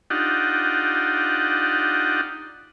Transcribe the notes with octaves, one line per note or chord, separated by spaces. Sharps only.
D4 D#4 F4 G4 F#5